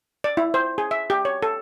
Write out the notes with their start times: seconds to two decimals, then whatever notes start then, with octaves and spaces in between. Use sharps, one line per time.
0.24 D5
0.37 E4
0.54 C5
0.78 G#4
0.91 E5
1.10 G4
1.25 C#5
1.43 A4